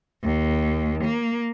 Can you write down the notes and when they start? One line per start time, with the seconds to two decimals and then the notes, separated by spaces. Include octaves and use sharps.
0.24 D#2
1.04 A#3